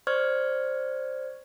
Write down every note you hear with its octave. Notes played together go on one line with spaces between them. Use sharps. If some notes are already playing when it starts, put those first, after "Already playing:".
C5 D5 C#6 F6 G#6